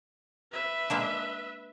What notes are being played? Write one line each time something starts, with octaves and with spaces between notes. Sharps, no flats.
B4 E5
G#3 A#3 D4